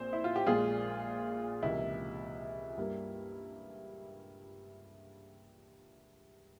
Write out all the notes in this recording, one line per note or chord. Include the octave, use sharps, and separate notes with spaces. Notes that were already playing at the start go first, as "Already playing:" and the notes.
Already playing: A#1 A#2 C4 C5
E4
F4
G4
A#1 A#2 G#3 F4 G#4
C#2 C3 E3 A#3 E4
G2 G3 A#3